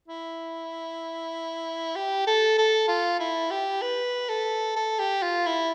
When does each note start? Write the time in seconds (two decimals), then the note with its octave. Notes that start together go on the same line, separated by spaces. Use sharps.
0.08 E4
1.96 G4
2.27 A4
2.58 A4
2.88 F4
3.20 E4
3.51 G4
3.82 B4
4.29 A4
4.76 A4
4.99 G4
5.23 F4
5.46 E4